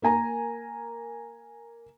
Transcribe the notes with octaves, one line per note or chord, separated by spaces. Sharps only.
A#3 A#4 G#5 A#5